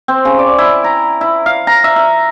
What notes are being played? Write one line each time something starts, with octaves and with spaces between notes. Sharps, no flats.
C4
C#3
D5
E4
A#5
E4
F5
A#5
E5
E5